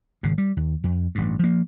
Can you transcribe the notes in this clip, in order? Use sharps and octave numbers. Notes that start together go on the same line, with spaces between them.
G#1 C#3
G3
D#2
F2
A1 G2
F3 A#3